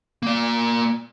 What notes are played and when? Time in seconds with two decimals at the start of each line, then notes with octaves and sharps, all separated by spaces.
0.23 A#3 D5